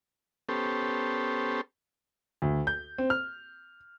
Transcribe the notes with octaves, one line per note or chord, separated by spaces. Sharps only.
B3 C#4 G4 A4 C5
D2
G6
C4
F6